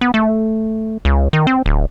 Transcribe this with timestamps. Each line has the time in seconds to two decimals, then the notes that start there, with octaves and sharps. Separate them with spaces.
0.01 B3
0.14 A3
1.05 C#2
1.33 D#3
1.47 C4
1.66 D1